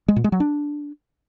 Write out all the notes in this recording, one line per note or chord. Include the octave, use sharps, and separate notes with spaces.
G#3
A#2
G#3
F#3
D4